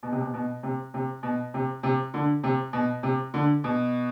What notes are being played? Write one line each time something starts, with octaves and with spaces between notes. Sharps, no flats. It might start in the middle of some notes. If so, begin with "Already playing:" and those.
B2
C3
B2
B2
C3
C3
B2
C3
C3
D3
C3
B2
C3
D3
B2